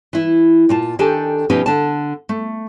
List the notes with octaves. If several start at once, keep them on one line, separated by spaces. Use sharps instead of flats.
E3 E4
A#2 F4 A5
D#3 D4 G4 A4 G#5 A5
B2 F3 C#4 D#4 G4 B4
D3 A5
A3